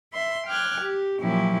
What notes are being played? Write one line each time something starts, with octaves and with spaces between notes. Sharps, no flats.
E5 C6
G5 D6 F6 F#6 G#6
G4
A#2 F3 F#3 C#4 E4 G4